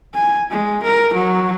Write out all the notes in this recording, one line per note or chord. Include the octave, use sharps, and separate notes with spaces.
G#5
G#3
A#4
F#3